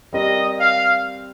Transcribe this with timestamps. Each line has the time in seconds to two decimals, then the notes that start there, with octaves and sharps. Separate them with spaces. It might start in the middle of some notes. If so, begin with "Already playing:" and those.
0.13 G3 C4 G4 A#4 D#5
0.59 F5